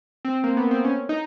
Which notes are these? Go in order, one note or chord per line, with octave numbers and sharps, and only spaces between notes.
C4
A#3
B3
C4
C#4
D#4